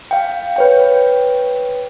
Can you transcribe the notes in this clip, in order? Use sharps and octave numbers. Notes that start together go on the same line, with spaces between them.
F5 G5
B4 C#5 G5